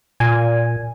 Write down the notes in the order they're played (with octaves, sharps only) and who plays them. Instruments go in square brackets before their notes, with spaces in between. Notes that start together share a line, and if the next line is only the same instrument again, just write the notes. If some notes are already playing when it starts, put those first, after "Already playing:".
[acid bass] A#2 [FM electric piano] G#5